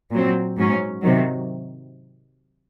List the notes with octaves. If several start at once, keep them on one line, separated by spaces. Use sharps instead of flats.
A#2 F#3 C4
G#2 F#3 C#4
C3 D#3 F#3